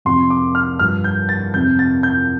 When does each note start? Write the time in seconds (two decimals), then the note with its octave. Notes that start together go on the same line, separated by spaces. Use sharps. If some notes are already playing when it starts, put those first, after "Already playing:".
0.05 F2 C3 F3 C6
0.30 D6
0.55 F6
0.79 G2 F3 F6
1.04 G6
1.29 A6
1.54 F2 C3 F3 G6
1.79 A6
2.03 G6